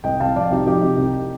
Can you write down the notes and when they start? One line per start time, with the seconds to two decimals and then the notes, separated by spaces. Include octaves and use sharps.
0.04 C2 D#5 G5
0.20 C2 F5 A5
0.35 F3 D5 F5
0.51 C2 D#4 G4
0.66 F3 D#4 G4
0.82 C3
0.98 C2